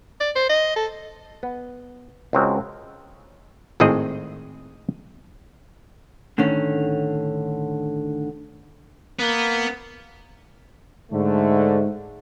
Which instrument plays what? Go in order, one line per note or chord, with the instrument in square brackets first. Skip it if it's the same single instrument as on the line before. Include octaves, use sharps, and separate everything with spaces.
[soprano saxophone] D5
C5
D#5
A4
[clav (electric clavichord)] B3
C#2 G#3 C4 F#4 A#4
G#1 A2 D#3 C4 G#4 D#5
[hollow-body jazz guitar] A2 D3 D#3 C#4
[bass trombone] A#3 [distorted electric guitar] B3
[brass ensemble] G#2 D3 A3